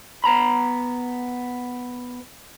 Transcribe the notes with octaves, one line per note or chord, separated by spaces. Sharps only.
B3 A#5 B5